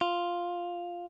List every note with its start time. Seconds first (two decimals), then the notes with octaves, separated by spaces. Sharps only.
0.01 F4